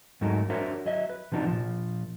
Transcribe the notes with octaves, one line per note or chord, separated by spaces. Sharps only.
G#2 F#3 A3 D#4 F#4 A#4
D4 F#4 A#4 C5 C#5 E5
F#3 D#5 E5
B4
C3 F3 D4 D#4 F#4
A#2 F3